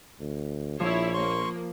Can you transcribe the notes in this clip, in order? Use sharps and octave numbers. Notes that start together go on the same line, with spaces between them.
D2
A#1 F3 E4 C#5
A#3 C6 C#6